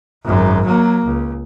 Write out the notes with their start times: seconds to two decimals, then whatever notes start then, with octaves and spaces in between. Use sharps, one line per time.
0.25 G#1 F#2
0.65 F#3 A#3
1.05 C#2